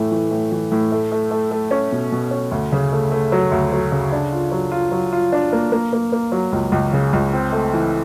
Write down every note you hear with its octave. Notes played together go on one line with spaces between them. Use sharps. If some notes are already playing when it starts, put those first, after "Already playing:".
Already playing: A2 E3 A3
E3
A2
E3
A2
A3
A3
A3
A3
C#4
B2
B2
C#4
D2
C#3
A3
A3
F#3
D2
F#3
C#3
D4
F4
F#3
F4
F#3
F4
D4
A#3
A#3
A#3
A#3
F#3
C#2
C#2
C#3
C#2
C4
A3
E3